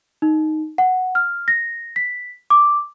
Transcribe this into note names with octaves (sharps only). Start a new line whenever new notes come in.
D#4
F#5
F6
A#6
B6
D6